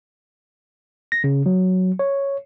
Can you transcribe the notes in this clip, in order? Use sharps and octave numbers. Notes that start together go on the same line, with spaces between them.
A#6
C#3
F#3
C#5